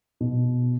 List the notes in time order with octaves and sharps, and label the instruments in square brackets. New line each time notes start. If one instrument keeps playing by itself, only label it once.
[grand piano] B2